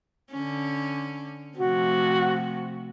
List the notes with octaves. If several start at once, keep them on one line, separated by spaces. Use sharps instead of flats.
D3 C#4
C3 F3 A3 F#4